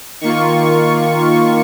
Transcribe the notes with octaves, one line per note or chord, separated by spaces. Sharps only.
D#3 A#3 F4 C#6